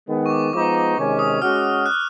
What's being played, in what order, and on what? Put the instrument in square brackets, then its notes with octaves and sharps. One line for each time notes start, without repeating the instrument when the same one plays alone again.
[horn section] D#3 G#3 B3
[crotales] C#6
D6
[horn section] F3 G#3 B3 D#4 [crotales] D6
[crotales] D6
[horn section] C3 D#3 G#3 C#4
[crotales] D#6
[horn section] G#3 C#4 F#4 [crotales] F6
[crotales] F#6